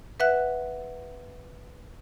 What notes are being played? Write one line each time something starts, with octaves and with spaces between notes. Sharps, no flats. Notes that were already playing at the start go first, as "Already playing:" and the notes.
B4 E5 F#5 F#6